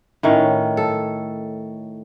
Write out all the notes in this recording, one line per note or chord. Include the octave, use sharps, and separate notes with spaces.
A2 D#3 C#4
A4